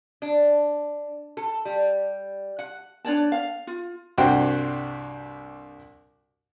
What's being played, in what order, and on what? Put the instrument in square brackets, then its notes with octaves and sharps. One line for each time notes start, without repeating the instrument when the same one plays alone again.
[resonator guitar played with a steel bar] D4
A4
G3
F#5
[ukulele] D4 C#5 D5 A5
F5
F4
[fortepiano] C2 G2 F#4 C5 G5